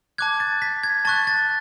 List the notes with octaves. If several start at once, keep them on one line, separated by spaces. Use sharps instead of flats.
A5 D6 F#6 G#6
A6
B6
G#6
A5 C#6 F#6 A6
A6